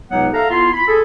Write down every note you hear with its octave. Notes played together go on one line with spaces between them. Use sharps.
C#2 C3 F#3 B3 D#4 F#5
A4 E5 F5 A#5
B3 E4 F4 C6
B5
G#4 A4